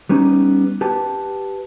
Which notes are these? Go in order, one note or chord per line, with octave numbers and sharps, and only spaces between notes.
G3 B3 C#4 D#4
G4 B4 A5